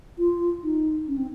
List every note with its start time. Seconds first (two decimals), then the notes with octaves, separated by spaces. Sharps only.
0.19 F4
0.64 D#4
1.08 C#4
1.18 C4